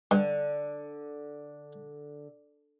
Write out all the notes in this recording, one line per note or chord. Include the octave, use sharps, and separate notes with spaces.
G2 D3